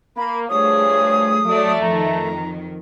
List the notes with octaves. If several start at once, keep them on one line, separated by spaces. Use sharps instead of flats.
A#3 B5
G2 F3 A3 G#4 C#5 D#6
F#3 A3 D5
F2 D#3 A#5